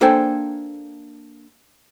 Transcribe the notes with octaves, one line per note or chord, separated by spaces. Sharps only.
A#3 D4 A4 C5 G5 G#5